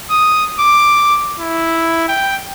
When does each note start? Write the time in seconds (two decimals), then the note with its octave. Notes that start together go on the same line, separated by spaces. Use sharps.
0.10 D#6
0.59 D6
1.39 E4
2.09 G5